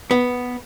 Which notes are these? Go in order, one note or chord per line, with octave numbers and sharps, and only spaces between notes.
B3